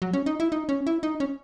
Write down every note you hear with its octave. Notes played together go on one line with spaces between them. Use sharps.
F#3
C#4
D#4
E4
D#4
C#4
E4
D#4
C#4